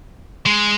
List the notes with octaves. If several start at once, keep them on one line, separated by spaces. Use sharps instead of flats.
G#3